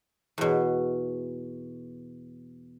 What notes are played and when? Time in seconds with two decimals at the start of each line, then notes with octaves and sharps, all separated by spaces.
0.38 E2 B2